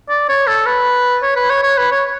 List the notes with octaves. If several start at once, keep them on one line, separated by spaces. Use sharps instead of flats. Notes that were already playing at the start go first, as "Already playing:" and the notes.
D5
C#5
A4
B4
C#5
B4
C#5
C#5
B4
C#5